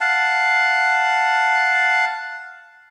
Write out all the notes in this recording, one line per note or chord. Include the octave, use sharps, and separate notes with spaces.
F5 F#5 A5